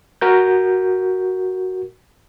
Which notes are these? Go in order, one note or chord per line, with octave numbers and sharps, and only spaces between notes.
F#4 A#4 G6